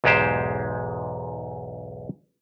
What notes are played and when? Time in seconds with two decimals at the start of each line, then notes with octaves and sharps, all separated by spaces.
0.04 B1 E2 G#2 G#3 G4 C5